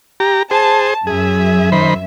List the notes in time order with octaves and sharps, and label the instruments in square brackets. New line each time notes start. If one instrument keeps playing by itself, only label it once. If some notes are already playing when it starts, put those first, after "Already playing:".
[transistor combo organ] G4 A#5
[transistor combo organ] G#4 C5 [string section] A5
[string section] F#2 E5 [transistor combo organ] G#4
[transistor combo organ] D#3 C5 B5